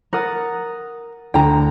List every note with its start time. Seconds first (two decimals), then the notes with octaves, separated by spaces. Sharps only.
0.13 A#4 F#5 D#6 A6
1.34 D2 G5 A#5